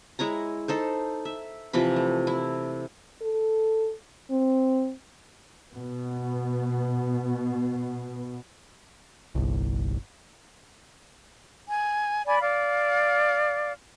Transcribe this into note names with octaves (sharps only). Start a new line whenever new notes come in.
G#3 E4 C#5 A#5
D#4 A4 C5
E5
C3 E3 F3 B5
A3
E4
A4
C4
B2 B3
G1 C2
G#5
D5 G#5 B5
D5 F5